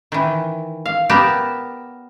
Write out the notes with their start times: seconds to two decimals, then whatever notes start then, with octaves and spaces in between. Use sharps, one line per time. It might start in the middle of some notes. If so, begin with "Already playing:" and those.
0.12 D#3 E3
0.86 F5
1.09 B3 G4 A#4 D5 A5